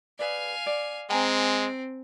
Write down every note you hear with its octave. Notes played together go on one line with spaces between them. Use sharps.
G#4 B4 D5 F5 G#5
D5
G#3 C4 G5 G#5 A#5